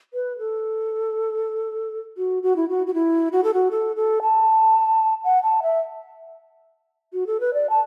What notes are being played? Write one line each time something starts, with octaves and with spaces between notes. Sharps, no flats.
B4
A4
F#4
F#4
E4
F#4
F#4
E4
F#4
A4
F#4
A4
A4
A5
F#5
A5
E5
F#4
A4
B4
D5
A5